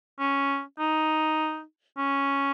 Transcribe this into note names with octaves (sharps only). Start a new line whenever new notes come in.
C#4
D#4
C#4